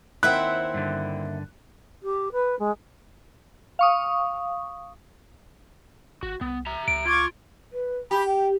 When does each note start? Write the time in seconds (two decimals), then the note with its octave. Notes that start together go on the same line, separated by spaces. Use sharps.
0.23 D#2 C4 E4 E5 F#5 F#6
0.74 G2 D3
2.02 G4
2.32 B4
2.59 G#3
3.79 F5 C#6 D#6
6.23 G1 F#4
6.41 C2 B3
6.66 E5 A#5
6.88 C#2 D7
7.05 F4 C#6 D6 G#6
7.72 B4
8.11 G4 B5
8.26 G5